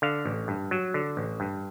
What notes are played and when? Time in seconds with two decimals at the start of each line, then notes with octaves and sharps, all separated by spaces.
0.02 D3 F5
0.26 A1
0.48 G2
0.71 F#3
0.94 D3
1.17 A1
1.40 G2